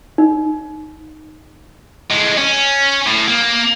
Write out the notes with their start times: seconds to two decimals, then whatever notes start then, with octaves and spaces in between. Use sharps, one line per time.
0.18 D#4
2.10 A2 G#3
2.37 C#4
3.07 A2
3.28 A#3